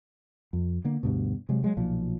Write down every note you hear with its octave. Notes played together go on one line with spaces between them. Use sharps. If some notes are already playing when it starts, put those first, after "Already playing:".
F2
D3 A#3
D2 G2 B2
C3 F#3 G#3
F#3 G#3
B1 A#2 F3